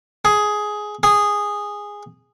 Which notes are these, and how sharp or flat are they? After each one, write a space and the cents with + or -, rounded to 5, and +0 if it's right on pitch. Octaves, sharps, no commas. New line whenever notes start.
G#4 +10
G#4 -10